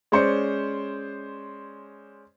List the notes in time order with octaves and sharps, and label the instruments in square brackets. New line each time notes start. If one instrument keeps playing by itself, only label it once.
[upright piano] G#3 C#4 C5 D5 C#7